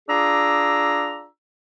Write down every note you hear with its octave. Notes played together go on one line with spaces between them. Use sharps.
D4 F4 G#4 A#5 D6 E6